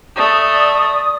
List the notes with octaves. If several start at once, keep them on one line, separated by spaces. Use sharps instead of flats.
A3 D5 D#6